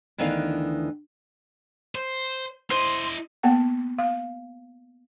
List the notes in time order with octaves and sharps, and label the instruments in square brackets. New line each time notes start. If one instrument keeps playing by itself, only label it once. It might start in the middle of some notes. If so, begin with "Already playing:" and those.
[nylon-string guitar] D2 D#3 E3 B3 D4 F5
[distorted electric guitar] C5
[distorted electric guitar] E4 D#5 [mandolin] C5
[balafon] A#3 B3 F#5 G5
F5